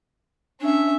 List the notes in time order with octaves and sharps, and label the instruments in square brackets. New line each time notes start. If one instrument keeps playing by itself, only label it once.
[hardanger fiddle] C#4 E5 [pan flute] D4